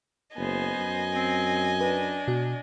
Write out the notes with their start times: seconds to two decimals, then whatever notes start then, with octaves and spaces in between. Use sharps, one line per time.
0.37 F#1 B3 C5 D#5 G#5
0.76 F#2
1.13 C4
1.81 D4 B4
2.28 B2 F#4